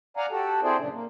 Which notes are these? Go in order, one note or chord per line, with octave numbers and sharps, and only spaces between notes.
D5 F5 F#5 G#5 A#5
F#4 G4 A4
C4 E4 G#4 A4 C5 D5
F#2 A#2 C#3 D4
A#3